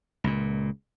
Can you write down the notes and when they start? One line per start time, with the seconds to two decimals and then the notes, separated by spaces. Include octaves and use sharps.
0.24 C#2 A#2